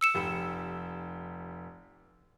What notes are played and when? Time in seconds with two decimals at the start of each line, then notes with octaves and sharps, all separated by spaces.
0.01 E6 C#7 E7
0.15 F1 G4 B5